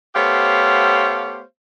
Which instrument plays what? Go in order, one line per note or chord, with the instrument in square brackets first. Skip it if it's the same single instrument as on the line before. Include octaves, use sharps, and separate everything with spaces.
[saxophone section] A3 B3 G4 C5 C#5 F5